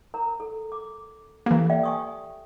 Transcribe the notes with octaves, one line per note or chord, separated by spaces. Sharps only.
A#4 A#5
A4
D6
E3 A#3 G4 A4
D5 E5 G5
G#5 C#6 D#6